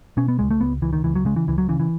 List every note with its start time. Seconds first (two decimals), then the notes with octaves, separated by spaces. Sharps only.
0.17 B2 C#4
0.28 B3
0.39 C#2 G#3
0.51 A3
0.61 C#2 B3
0.82 C#2 E3
0.93 D#3
1.04 C#2 E3
1.15 F#3
1.25 C#3 G#3
1.36 E3
1.48 C#2 E3
1.58 F#3
1.69 C#3 E3
1.80 E3